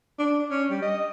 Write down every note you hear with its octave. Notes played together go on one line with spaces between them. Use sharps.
D4
C#4
G3
D#5